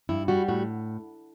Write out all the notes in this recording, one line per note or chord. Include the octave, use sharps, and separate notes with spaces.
G2 E4
G3 F#4
A2 F#4